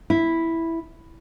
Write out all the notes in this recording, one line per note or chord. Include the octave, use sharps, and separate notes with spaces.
E4